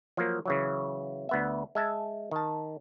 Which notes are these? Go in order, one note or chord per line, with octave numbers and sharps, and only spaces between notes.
F3 F#3 A#3
C#3 E3 F#3
D2 B3 E5
G#3 E5 A5
D#3 A5